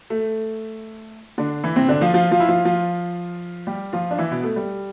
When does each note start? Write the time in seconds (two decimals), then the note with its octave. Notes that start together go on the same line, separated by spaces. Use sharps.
0.10 A3
1.38 D3 D4
1.63 E3 E4
1.76 C3 C4
1.88 D3 D4
2.01 F3 F4
2.14 F3 F4
2.31 F3 F4
2.40 E4
2.48 F3 F4
2.65 F3 F4
3.67 G3 G4
3.93 F3 F4
4.11 D4
4.18 E3 E4
4.31 B2 B3
4.44 A3
4.56 G3